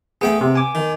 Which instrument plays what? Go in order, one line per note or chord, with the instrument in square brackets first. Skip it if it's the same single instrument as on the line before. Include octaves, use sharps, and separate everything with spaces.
[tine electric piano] A3 G#4 [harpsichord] B3 G5 B5
[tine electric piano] C3
G#5 D6
[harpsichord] D#3